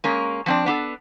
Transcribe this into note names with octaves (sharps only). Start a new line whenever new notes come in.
G#3 A#3 C#4
F3 C4 D4
B3 D4 A4